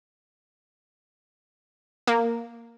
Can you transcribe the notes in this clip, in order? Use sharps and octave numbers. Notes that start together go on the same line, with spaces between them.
A#3